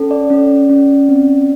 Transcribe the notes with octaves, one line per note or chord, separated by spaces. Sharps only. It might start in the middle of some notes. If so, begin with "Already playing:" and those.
Already playing: C#4 A4
D5
C#4
C#4
C4